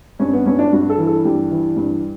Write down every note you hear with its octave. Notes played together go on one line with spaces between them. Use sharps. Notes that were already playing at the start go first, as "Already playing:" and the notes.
G2 C#4
B3
G2 C#4
D4
G2 F#4
A4
E3
A4
G2 G4
E3
G2